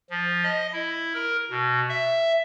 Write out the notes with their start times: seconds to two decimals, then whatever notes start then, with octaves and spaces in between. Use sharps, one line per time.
0.10 F3
0.44 D#5
0.73 E4
1.14 A#4
1.50 B2
1.89 E5